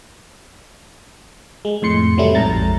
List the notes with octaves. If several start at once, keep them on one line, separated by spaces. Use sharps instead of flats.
G#3
F2 A2 C6 C#7
C3 E3 F#3 G3 A3 E4
A#1 F2 G#2 A#5 A6